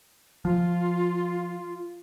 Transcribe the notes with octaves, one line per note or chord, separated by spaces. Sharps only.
F3 F4